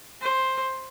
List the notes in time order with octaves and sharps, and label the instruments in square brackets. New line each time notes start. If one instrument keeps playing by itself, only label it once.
[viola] C5